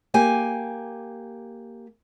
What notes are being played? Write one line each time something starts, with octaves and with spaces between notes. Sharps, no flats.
A#3 G4 G#5